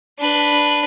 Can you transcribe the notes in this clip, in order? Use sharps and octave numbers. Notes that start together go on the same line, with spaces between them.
D4 B4